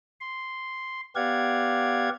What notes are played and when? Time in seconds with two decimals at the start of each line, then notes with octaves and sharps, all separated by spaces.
0.21 C6
1.15 B3 G4 D5 F5 F#5 G#6